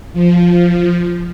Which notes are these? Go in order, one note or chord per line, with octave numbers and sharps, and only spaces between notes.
F3